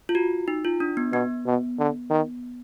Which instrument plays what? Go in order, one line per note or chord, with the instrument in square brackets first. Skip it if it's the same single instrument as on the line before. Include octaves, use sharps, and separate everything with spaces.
[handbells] F4
F#4
D#4
F4
D4
B3
[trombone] B2 [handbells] B3
[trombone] B2
D3
D#3